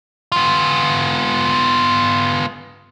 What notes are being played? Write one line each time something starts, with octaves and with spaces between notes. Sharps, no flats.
B3 F4